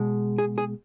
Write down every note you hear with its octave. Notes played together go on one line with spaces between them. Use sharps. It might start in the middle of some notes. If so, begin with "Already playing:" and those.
Already playing: B2 G#3
G#4
G#4